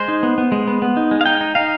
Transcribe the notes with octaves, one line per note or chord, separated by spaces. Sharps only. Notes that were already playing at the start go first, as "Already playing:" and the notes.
Already playing: G#3 C5
D#4
B3
B3
G#3
B3
B3
D#4
G#3
F5
D#4 G5
D#4
D#4 F5